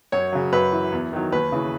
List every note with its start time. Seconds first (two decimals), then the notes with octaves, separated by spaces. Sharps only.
0.12 F#2 C#5
0.32 C#3 F#3
0.53 F#2 B4
0.72 E3
0.92 E2
1.13 D#3 F#3
1.33 D#2 B4
1.52 C#3 E3